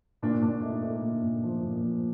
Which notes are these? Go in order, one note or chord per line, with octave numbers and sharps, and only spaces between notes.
A#2 D4
A#2 D4
A3 D#4
A3 D4
A#2
A#2
F3
A#2
F3